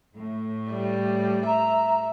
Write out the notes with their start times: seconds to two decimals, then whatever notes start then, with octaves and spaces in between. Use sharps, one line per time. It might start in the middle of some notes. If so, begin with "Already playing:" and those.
0.15 A2
0.70 G3
1.46 E5 A#5